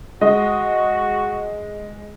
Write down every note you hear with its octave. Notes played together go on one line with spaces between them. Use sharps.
G#3 F#4 D#5